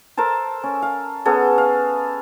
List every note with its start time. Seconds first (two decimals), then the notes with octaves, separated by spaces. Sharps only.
0.17 A4 A#4 C5 A5
0.63 C#4
0.82 F5
1.25 B3 C#4 G#4 A4
1.58 F5